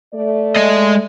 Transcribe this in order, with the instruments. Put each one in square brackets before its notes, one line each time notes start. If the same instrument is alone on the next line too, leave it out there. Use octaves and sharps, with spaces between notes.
[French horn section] A3 D5
[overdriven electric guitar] G#3 D#5